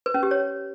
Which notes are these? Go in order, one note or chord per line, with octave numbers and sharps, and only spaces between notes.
B4
C#4
G4
C#5